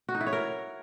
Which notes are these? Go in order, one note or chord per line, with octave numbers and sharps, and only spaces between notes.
F#4
D#4
E4
C#5
A#4